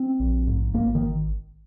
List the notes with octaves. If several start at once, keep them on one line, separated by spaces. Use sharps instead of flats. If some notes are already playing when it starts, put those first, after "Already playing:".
Already playing: C4
A#1
G#2
G#1 A#3
D#3